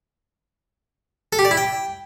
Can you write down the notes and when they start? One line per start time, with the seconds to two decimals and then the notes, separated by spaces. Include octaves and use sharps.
1.33 A4
1.39 G4
1.45 D5
1.51 E4
1.57 G5